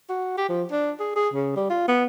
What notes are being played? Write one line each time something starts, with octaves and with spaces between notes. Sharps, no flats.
F#4
G4
F3
D4
G#4
G#4
C#3
G3
F4
B3